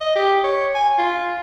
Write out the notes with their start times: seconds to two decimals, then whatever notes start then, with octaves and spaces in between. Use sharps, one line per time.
0.01 D#5
0.16 G4
0.44 C#5
0.75 G#5
0.98 F4